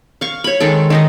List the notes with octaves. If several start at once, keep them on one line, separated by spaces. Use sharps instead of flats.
F5 C#6
C#5 B5
D#3 G#3 A4
D#3 D#4 D#5